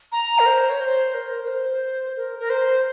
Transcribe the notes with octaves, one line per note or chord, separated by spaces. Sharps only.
A#5
A#4
C5
C#5
C5
A#4
A#4
C5
A#4
A#4
C5